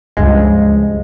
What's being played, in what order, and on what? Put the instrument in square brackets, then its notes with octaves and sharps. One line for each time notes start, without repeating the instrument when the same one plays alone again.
[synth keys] C#2 G2 F3 G#3